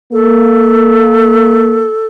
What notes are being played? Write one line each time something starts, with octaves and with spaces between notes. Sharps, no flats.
A#3 A4